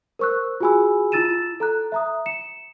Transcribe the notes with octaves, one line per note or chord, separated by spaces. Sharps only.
A#4 C5 C#6 E6 F#6
F4 F#4 G#4 G#5 B5 E6
E4 F4 E6 A6 D#7 E7
A4 A#5 F#6
E5 A#5 D#6
C#7 E7